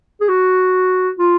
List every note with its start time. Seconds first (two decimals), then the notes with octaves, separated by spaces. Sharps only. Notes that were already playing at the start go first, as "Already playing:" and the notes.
0.21 G#4
0.29 F#4
1.19 F4